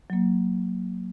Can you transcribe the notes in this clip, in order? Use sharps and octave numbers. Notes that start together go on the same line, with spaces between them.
F#3 A#3